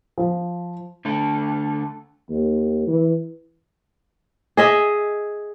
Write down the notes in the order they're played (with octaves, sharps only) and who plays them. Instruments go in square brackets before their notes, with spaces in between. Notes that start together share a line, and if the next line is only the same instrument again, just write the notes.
[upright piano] F3
[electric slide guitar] D3 A3 A4
[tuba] D#2
E3
[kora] G#4 D#5 E5